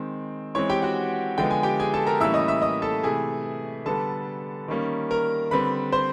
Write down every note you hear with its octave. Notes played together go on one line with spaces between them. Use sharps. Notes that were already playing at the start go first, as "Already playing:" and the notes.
Already playing: D#3 G#3 C4
E3 G#3 C4 C#5 C#6
G4 G5
F#4 F#5
D3 F3 G#3 B3 G5
G#5
G4 G5
G#4 G#5
A4 A5
A#4 A#5
A2 E3 G3 A#3 C#4 E5 E6
D#5 D#6
E5 E6
D#5 D#6
A4 A5
C3 E3 A3 G#4 G#5
D3 G3 B3 A4 A5
D#3 G3 A#3 C#4
A#4 A#5
D3 G3 C4 B4 B5
C5 C6